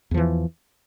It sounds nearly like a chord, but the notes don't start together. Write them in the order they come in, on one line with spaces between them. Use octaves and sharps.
E2 F3 E3